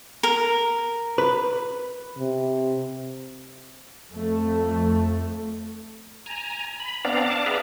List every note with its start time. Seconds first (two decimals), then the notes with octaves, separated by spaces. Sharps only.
0.23 A#4
1.18 B4
2.18 C3
4.10 F2 A3
6.26 G#5 A#5
6.80 B5
7.05 B3 C4 D4 D5 F5 A#5
7.26 F5 A5 D6
7.46 G#4 B4 D5 E5 F5 A#5